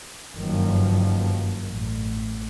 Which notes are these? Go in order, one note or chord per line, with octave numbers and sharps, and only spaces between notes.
F#1 G2 D#3 F3 F#3 A#3
A1